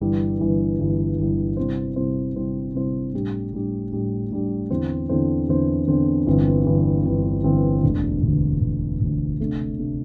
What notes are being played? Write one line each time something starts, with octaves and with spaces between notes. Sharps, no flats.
G1 G2 E3 G3 E4
G1 G2 E3 G3 E4
G1 G2 E3 G3 E4
G1 G2 E3 G3 E4
C3 G3 C4 E4 C5
C3 G3 C4 E4 C5
C3 G3 C4 E4 C5
C3 G3 C4 E4 C5
A2 G3 D4 G4
A2 G3 D4 G4
A2 G3 D4 G4
A2 G3 D4 G4
E2 D3 C4 E4 C5
E2 D3 C4 E4 C5
E2 D3 C4 E4 C5
E2 D3 C4 E4 C5
G1 G2 E3 C4
G1 G2 E3 C4
G1 G2 E3 C4
G1 G2 E3 C4
E1 D2 D3
E1 D2 D3
E1 D2 D3
E1 D2 D3
C3 A3 D4
C3 A3 D4